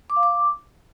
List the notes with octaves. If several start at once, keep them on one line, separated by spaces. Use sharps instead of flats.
D6
F5
D6